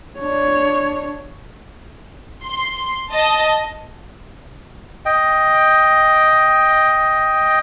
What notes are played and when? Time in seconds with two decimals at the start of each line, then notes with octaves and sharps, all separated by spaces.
0.19 D4 C#5
2.44 C6
3.13 D#5 A5
5.06 D#5 G5